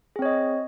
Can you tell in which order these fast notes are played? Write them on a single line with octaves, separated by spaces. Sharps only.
G#4 C4 C#5 D#5